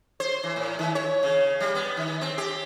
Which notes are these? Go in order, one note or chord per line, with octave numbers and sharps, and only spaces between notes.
C5
E3
A2
D#3
C#5
C#3
G3
B3
D#3
C4
G4